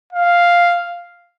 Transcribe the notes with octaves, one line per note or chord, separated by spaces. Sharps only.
F5